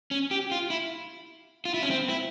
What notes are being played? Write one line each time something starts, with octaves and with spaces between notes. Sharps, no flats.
C#4
G4
F4
E4
F4
E4
C#4
C4
E4